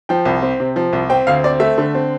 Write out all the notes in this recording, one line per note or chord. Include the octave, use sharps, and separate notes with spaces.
F3 G5
C2
C4
C3
F3
C2
C4 G5
D2 F5
C4 D5
A3 E5
D3
C4